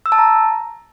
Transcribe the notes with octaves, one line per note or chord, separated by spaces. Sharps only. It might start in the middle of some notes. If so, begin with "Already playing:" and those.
E6
A5
A#5